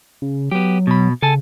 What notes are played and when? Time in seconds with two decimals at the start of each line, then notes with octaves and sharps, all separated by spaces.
0.22 C#3
0.51 F#3 B3 G4
0.87 B2 B5
1.22 C#3 A4 G#5 A5